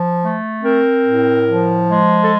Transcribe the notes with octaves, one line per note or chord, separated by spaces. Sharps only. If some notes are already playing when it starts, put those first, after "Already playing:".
Already playing: F3
A3
C4 A#4
A2
F3
G#3
A4